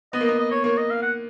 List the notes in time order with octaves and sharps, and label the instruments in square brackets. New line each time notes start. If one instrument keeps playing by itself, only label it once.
[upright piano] B3 [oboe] D#5
[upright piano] A#3
[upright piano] B3 [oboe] D#5
[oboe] D#5
C#5
[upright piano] A#3 [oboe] C#5
[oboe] D#5
F5
F#5